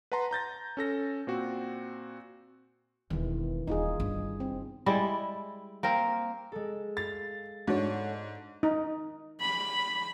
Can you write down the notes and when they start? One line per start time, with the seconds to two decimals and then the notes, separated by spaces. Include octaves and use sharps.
0.12 B4 F#5 A5 A#5 C6
0.31 A#5 G6 A6 A#6
0.77 C#4 A4 A#6
1.27 A#2 C4 F#4
3.10 E1 D#3 E3
3.67 D#1 D#4 F4 G#4
4.00 G1 D4
4.40 C4
4.86 G3 G#3 E4 D5
5.83 A#3 C4 A#4
6.52 G#3 A4
6.97 F5 A6
7.68 G#2 D4 F#4 A4 C#5
8.63 D#4
9.41 B5